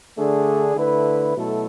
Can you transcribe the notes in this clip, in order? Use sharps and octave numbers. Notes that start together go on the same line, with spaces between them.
D3 A3 D4 G#4
D3 A3 E4 B4
B2 F#3 A3 E4 A4